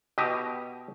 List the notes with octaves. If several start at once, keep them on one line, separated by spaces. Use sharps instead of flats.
B2 G4 D#5